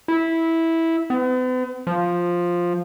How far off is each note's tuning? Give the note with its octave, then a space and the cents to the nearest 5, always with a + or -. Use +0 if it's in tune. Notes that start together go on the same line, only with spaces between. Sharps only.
E4 -10
B3 +45
F3 +5